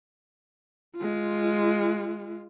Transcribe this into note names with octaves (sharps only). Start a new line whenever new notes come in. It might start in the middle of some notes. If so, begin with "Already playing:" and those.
G#3 F4